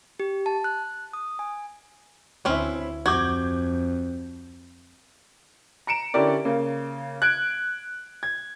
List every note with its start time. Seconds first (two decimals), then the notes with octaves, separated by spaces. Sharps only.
0.20 G4
0.46 A5
0.64 F#6
1.13 D#6
1.39 G#5
2.45 D2 C4 C#4 E4 B4
3.06 F2 F#4 D6 G6 G#6
5.87 A#5 C#7 D7 E7
6.14 D3 C#4 E4 G4 A#4 D5
6.45 C#3 A#3
7.22 F#6 G#6 D7
8.23 G#6